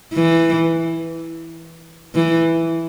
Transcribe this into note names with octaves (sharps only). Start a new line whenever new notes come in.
E3
E3